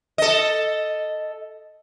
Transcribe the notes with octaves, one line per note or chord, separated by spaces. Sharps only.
A4 D#5